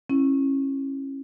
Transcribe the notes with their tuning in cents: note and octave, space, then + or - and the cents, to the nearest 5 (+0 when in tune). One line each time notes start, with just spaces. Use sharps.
C#4 -30 E4 +0